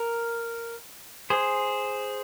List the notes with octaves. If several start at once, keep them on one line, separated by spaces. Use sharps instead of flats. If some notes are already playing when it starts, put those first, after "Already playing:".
Already playing: A#4
G#4 C5